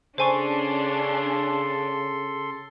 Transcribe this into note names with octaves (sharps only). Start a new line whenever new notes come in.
C#3 C#4 D4 A4 C5 G#5 C6 C#6